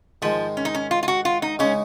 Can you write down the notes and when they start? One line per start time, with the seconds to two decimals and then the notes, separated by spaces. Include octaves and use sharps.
0.22 G#2 D#3 F3 G#3
0.57 C#4
0.65 D#4
0.75 C#4
0.91 F4
1.03 F4
1.08 F#4
1.25 F4
1.42 D#4
1.59 C#3 G#3 C#4 D#4